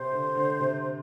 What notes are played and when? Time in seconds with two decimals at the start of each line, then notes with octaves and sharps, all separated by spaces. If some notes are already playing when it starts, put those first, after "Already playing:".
Already playing: C3 C5
0.12 D3
0.35 D3
0.60 C3